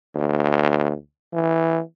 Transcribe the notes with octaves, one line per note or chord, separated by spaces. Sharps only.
D2
E3